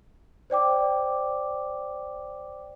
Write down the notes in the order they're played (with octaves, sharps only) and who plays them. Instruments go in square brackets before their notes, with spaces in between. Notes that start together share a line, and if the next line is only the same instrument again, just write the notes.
[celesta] C5 D5 G5 D6